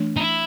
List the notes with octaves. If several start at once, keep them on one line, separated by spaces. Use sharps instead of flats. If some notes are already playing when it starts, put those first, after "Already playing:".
Already playing: E3 A3 D4
D#4
E4